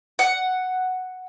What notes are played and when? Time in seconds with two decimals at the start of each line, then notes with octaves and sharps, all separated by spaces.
0.19 F#5